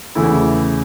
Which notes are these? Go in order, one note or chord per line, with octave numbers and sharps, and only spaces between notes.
E2 C#3 E3 A3 E4